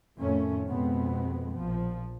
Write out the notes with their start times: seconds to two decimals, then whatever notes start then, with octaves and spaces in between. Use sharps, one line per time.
0.17 F2 A2 D#3 A3 C#4
0.68 F2 B2 G#3 B3 C4
1.53 A#1 F3